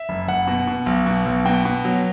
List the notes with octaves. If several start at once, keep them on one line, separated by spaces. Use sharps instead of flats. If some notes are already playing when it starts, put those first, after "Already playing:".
Already playing: E5
F#1
F#1 F#5
B2
B2
B1
B2
B1
B2 G5
B2
F#3